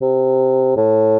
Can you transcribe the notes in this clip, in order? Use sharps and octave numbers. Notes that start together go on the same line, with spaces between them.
C3
A2